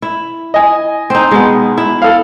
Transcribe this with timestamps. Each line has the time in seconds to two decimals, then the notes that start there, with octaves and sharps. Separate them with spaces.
0.02 E4
0.54 D#5 G#5
1.10 C4 D#4
1.31 B2 G#3 B3
1.78 E4
2.02 A4 F5